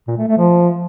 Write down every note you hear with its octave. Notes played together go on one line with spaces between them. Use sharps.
A#2
A3
A3
F3